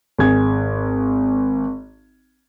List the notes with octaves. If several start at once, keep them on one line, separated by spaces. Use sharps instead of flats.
G#1 G#4 G#6